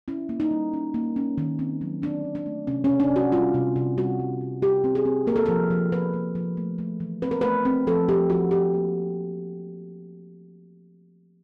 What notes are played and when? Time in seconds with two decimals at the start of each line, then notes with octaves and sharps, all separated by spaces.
0.08 C#4 E4
0.29 A#3
0.40 D#4
0.51 G3
0.73 C#4
0.94 A#3
1.16 C#4
1.38 D#3
1.59 C4
1.81 F#3
2.02 C4 D4
2.24 D#3
2.35 D4
2.46 A3
2.67 C3 C#4
2.84 C3 C#4
3.00 D4
3.11 C3
3.16 F#4
3.32 G3 F4
3.54 C3
3.76 C3
3.98 G3 F#4
4.19 G3
4.41 G3
4.62 G3 G4
4.84 C4
4.95 G#4
5.05 C4
5.27 A#3 A#4
5.36 A4
5.46 F3 A#4
5.71 F3
5.92 F3 B4
6.13 A#3
6.35 F3
6.57 A3
6.78 A3
7.00 E3
7.22 C4 B4
7.31 A#4
7.41 A3 B4
7.65 C4
7.87 F3 A4
8.09 F3 G4
8.30 F3 F#4
8.51 F3 G4
8.74 A#3